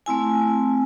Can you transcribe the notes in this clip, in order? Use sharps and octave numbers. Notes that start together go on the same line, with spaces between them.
A3 C4 E4 G#5